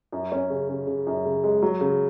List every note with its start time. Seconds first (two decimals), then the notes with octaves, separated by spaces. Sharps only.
0.12 F#2
0.32 C#4
0.50 C#3
0.69 C#3
0.87 C#3
1.07 F#2
1.25 C#3
1.44 G#3
1.62 F#3
1.81 C#3